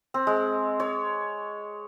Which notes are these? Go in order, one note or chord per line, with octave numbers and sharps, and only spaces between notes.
C4
G#3
C#5